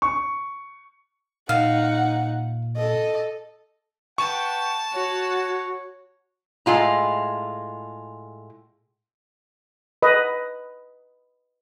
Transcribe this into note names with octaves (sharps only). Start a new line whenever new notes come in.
C#6
A#2 D#4 F5 F#5
A4 D#5
B4 F#5 G5 A5 C#6
F#4 C#5
A2 G#3 F4 A#5
B4 D#5